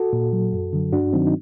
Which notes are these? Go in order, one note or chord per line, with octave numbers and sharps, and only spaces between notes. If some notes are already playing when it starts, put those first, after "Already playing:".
Already playing: F#4 A4
A#2
F#3
F#2
D3 F#3
G2 D4 F#4
D#3 F#3 C4 D#4
D#4